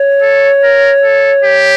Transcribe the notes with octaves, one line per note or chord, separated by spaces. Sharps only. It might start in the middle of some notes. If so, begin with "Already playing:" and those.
Already playing: C#5
A4
A#4
A4
G4